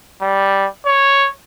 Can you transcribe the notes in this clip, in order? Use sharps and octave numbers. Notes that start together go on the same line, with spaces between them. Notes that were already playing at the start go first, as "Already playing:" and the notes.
G3
C#5